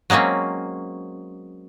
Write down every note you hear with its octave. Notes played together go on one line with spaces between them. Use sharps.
F#3 G#3 A#3 C4 C#4